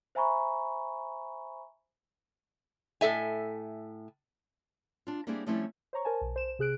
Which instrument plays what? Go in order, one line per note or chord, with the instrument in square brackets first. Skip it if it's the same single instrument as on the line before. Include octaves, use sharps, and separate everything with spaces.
[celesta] C5 E5 G#5 A#5 B5 C#6
[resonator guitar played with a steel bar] A2 A4 E5 G#5
[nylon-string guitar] D4 F4
G3 A#3 C4 D4 E4 G#4
F3 G3 A3 C4 C#4 E4
[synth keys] C5 C#5 A#5 C#6
A#4 C5 G#5 A5
B1
C5 E7
C3 G#4 F#6 D7